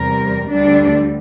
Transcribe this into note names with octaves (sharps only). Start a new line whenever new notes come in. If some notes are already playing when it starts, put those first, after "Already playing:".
Already playing: E2 C3 G3 A#4
D2 D3 G3 D4